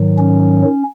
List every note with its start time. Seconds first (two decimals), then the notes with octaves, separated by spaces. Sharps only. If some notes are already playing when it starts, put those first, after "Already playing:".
Already playing: G#2 D#3 F#3
0.18 C#4